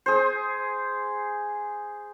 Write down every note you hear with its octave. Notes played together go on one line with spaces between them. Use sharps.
G#4 C5